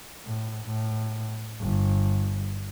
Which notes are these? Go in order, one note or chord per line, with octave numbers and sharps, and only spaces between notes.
A2
A2
G1